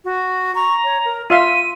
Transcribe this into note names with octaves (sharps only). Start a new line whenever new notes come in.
F#4
A#5 C#6
C#5
A#4
F4 E5 F5 C6 D#7